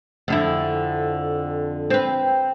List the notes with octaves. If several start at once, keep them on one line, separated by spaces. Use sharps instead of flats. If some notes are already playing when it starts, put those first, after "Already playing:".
F2 D3 E4
C4 B4